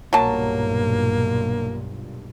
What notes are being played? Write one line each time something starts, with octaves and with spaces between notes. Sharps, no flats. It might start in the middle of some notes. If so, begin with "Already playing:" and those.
B1 G2 A#2 F#3 A#3 A5